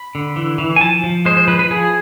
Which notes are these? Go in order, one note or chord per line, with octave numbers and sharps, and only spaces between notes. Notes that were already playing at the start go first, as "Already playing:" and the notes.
Already playing: B5
D3
E3
E3
G#5
F3 A5
F3
G#3 C5
C5
F3 B4
B4
F3 G#4